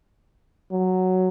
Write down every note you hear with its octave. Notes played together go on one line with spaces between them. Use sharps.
F#3